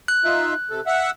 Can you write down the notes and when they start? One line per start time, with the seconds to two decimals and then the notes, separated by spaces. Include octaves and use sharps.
0.08 F#6
0.25 D#4 F4 E5
0.70 C3 A4
0.87 E5 F#5